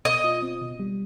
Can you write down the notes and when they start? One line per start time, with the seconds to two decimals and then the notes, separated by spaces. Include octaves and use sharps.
0.05 B2 D#5
0.24 F4
0.42 C4
0.62 B2
0.80 G3